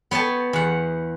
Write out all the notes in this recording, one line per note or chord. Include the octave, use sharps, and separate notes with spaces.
B3 C#5 G5 A5
E2 F#5